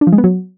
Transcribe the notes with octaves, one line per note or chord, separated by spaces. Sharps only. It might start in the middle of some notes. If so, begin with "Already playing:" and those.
D4
F3
G#3
B3
F#3